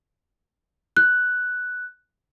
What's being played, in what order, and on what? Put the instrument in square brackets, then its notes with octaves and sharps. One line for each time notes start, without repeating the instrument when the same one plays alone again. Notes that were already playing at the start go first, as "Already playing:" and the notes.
[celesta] F#6